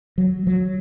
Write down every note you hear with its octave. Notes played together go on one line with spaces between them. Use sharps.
F#3
F#3